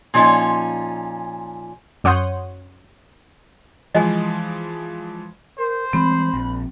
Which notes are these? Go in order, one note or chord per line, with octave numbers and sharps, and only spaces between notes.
A#2 F3 C#4 D#4
F#2 C#5 F#5 C6 D#6 G6
E3 F3 G#3 D#5 G#5
A#4 C5
E3 G3 G#3 C4 B5
A#1